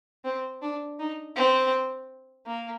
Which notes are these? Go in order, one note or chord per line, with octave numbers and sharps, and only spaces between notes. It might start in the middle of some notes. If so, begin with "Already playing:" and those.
C4
D4
D#4
C4
A#3